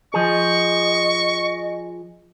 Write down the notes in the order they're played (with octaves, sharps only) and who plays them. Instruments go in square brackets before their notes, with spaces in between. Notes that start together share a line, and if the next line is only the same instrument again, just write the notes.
[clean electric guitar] F3 G#4 [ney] D#5 [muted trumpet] C#6